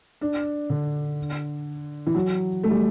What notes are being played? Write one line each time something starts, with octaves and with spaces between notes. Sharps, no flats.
D4
D3
E3
F#3
A3
G3